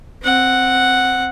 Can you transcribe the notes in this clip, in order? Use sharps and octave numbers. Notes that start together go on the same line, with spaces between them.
C4 F#5